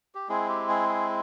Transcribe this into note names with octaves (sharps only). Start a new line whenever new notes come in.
G4
G#3 C4 E4 G#4
G4
G#4
G#4